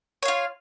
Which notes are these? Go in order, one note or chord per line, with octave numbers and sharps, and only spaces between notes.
F4 C#5 F5